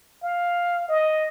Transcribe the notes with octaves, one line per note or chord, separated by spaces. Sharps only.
F5
D#5